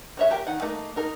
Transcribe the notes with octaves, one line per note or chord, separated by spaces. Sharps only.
F#4 C#5 E5
G4 A#4 G5
D#3 F#5
A3 A#3 D#4
D#4 A#4